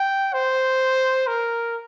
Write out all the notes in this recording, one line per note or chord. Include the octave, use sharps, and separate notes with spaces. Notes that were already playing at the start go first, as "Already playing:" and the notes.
Already playing: G5
C5
A#4